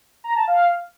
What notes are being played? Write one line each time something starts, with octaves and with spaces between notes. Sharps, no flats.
A#5
A5
F5